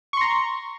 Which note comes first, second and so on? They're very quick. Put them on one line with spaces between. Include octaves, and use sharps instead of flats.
C#6 C6 A#5